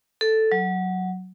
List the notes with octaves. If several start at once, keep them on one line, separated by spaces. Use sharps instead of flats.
A4
F#3